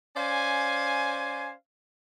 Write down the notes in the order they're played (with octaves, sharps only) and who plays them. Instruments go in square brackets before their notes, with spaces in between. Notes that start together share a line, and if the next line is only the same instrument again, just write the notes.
[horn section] C#4 C5 D5 F5 G#5